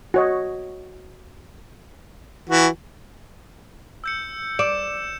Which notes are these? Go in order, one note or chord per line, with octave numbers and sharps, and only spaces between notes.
F#4 C#5 D#5
E3 F#4
E6 G6 C#7
D5 E7